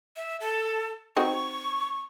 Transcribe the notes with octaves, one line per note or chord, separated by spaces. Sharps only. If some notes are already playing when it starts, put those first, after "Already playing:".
E5
A4
C4 D#4 F#4 C#6